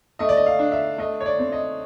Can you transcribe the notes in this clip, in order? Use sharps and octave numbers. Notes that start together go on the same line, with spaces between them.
A3 D#5
D5
D#5
F5
D4
E5
A3 D#5
C#5
D5
C4
D#5